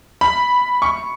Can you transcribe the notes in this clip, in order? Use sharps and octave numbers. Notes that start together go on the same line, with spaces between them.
B5
C#6